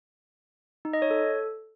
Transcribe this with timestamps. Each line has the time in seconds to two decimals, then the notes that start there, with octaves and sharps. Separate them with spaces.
0.85 D#4
0.93 D#5
1.02 C#5
1.11 A4